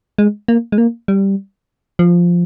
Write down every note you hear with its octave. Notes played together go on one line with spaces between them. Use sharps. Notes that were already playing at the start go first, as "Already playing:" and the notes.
G#3
A#3
G#3
A#3
G3
F3